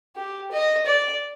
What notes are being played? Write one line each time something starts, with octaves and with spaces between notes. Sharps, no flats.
G4
D#5
D5